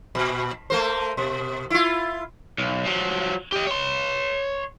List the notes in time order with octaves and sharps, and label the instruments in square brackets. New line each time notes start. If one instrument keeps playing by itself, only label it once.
[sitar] A#2
A3 A#3 C5
B2
E4 F4
[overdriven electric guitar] B1
F3 F#3
G4 D#5
C#5 C6